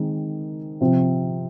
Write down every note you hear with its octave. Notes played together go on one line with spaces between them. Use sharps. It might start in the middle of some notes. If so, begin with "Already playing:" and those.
Already playing: D#3 G#3 C4 D#4
C3 F3 C4